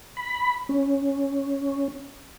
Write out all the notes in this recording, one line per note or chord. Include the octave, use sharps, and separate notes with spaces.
B5
C#4